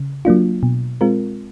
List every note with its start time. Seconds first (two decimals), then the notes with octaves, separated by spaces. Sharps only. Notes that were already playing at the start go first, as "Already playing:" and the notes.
Already playing: C#3
0.25 F#3 A#3 D4 F4
0.63 B2
1.01 G#3 C4 F4 A#4